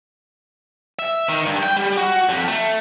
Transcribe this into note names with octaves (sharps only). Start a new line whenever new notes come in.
E5
D#3
G2
G5
G3
F#4
F2
A3